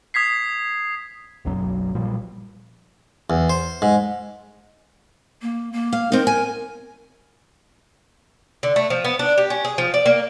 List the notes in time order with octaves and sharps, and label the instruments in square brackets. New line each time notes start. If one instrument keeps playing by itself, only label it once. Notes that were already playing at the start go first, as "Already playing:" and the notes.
[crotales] D#6 G#6 B6 C7
[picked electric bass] F#1 B1 F#2 F#3
A#2 F3 G3
[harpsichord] E2
C5
G#2
[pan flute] A#3
A#3
[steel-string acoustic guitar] F5
[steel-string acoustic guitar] C4 D#4 [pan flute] A#4
[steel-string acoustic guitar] G#5
[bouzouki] D3
A3
F3
B3
D4
G4
C#4
G#4
F3
D5
A#3